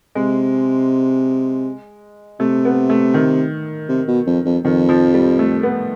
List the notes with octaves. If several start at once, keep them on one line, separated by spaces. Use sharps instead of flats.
C3 G#3
C3 A3
B3
A3
D#3
C3
B2
F2
F2
F2 D#3
F3
G3
A3
B3